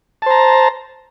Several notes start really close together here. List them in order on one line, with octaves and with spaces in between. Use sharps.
A5 C5 A#5